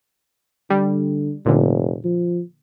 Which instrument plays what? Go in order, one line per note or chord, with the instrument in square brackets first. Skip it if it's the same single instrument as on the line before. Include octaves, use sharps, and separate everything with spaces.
[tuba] D3 [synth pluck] G3
[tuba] F1 [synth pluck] A#2 D3
[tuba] F3